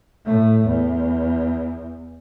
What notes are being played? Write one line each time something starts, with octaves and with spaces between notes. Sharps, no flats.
A2 A3
E2